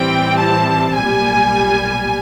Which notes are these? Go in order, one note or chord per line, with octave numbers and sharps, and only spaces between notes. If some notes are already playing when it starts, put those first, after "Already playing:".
Already playing: A2 E3 G3 C4 G5
A5
B1 A#2 G3 G#5